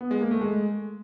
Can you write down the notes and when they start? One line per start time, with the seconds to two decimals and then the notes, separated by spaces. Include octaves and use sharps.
0.01 B3
0.11 G#3
0.21 A#3
0.31 A3
0.41 G#3